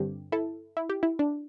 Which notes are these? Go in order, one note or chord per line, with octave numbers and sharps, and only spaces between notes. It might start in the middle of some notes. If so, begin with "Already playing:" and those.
Already playing: G2 D3 C4 G4
E4 A4
E4
G4
E4
D4